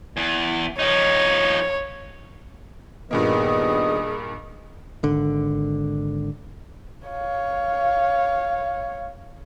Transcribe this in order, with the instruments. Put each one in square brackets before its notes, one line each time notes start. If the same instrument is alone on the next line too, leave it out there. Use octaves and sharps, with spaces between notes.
[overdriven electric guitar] E2
[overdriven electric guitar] F3 D#4 [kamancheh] C#5
[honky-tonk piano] G2 A#2 A#3 [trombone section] D#3 G3 B3 [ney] G#4 [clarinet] D#5
[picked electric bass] G#1 D3
[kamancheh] C#5 F5